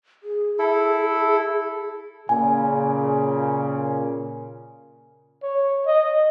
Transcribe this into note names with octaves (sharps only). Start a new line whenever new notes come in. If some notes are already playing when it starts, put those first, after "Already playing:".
G#4
E4 A4
A#2 C#3 G#5
C#5
D#5